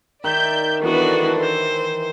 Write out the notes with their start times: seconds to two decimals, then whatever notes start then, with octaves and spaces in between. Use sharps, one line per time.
0.24 D#3 D5 E5 G6
0.83 E3 B3 D4 F#4 A4
1.39 E3 C5